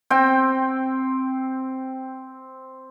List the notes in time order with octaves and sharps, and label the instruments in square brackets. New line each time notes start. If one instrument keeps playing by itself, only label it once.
[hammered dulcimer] C4 G5